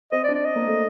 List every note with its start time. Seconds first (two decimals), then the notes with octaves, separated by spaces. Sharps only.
0.12 C4 D#5
0.24 D5
0.29 D4
0.35 D5
0.45 D#5
0.55 A#3
0.67 A3